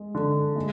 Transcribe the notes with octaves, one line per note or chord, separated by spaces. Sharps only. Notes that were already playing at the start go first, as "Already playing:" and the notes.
Already playing: G#3
D3
G#3